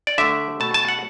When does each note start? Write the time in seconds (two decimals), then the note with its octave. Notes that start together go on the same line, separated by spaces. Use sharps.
0.07 D5
0.18 D3 A3 E5
0.60 B2 A3 A5
0.74 A5
0.88 F#5